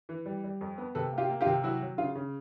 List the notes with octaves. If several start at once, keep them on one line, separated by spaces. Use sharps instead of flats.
E3
G3
G3
F2
B3
C3 A4 B4
A#3
F4 G4
A#3
F4 G4
C3
F#3 E4 F#4
F#3
C#3 F4
C#3